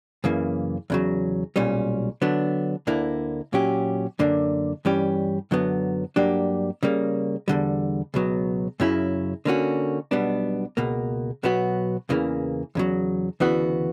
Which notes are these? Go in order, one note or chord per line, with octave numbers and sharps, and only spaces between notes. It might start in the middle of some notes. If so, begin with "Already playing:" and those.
F#2 C#3 E3 A#3
E2 C#3 F#3
B1 A#2 G3 C#4
D3 F#3 B3 D4
D2 D3 A#3 E4
A#2 F#3 C#4 G4
F#2 D3 A#3 D4
G2 E3 G3 C#4 G4
F#2 D3 F#3 B3
G2 F#3 A#3 D4 G4
C#3 G3 A#3
E2 D3 G3
C#2 B2 F#3 B3
F#2 C#3 F#3 C#4 E4
D3 A#3 C#4 F#4
B1 B2 G3 B3 D4
C#2 B2 A#3
B1 B2 F#3 B3 F#4
E2 C#3 E3 A#3
E2 C#3 F#3
D2 C#3 E3 B3 F#4